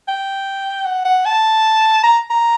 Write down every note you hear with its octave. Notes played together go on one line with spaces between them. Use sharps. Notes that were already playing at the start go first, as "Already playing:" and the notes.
G5
F#5
F#5
A5
A#5
A#5